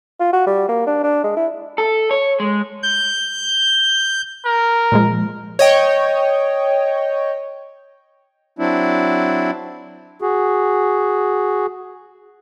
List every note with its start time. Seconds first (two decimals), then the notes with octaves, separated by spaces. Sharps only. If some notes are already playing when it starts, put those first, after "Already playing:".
0.20 F4
0.33 F#4
0.47 G3
0.69 A#3
0.87 D4
1.03 D4
1.24 G#3
1.37 E4
1.78 A4
2.11 C#5
2.40 G#3
2.83 G6
4.45 A#4
4.92 A#2 F3 G#3
5.59 C#5 D#5 G5
8.59 F#3 C4 D4 E4
10.21 F#4 G#4